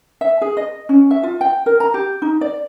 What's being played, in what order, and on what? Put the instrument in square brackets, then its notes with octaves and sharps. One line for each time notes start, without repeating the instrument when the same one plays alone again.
[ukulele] E5
G#4
D#5
C#4
E5
F4
G5
A#4
A#5
G4
D#4
D5